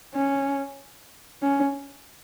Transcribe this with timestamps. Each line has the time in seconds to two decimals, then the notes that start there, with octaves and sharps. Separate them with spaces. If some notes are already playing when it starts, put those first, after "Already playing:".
0.15 C#4
1.42 C#4